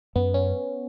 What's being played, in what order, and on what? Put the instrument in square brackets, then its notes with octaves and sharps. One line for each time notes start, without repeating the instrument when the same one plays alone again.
[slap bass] F#2 [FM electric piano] B3
[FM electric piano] C#4